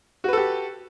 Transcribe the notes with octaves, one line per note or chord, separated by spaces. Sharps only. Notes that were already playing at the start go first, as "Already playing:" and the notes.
F#4 G4 A4 B4